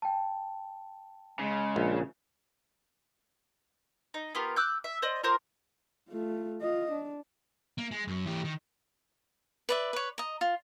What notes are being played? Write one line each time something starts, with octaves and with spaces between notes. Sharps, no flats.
G5 A5
C#3 G#3
A#1
D#4
B3 F4 G4 A#4
D6 E6 F#6 G6
E5
C5 D5 D#5
F4 A#4 C5 D6
A3 F4
F4 D#5
D4
A#3
G#3
F#2
E3 G4
D#3
B4 D5 E5
B4 C#5
D#5 A#5
F4